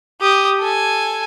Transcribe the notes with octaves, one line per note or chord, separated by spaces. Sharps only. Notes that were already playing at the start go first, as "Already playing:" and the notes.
G4 D#6
A4 G#5